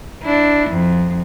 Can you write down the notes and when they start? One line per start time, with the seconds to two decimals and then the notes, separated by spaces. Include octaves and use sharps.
0.23 D4 E4
0.70 F2